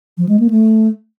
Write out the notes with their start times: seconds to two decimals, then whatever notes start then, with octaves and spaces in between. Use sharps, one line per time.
0.18 F3
0.29 G#3
0.39 A#3
0.50 A3